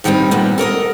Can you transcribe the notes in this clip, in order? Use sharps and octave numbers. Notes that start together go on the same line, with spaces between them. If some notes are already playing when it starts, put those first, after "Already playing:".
G2 D#3 G3 C4 D#4
D#2 A#2 B3
A4 A#4 C#5 D#5